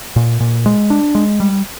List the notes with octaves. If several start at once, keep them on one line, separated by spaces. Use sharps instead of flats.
A#2
A#2
G#3
D4
G#3
G3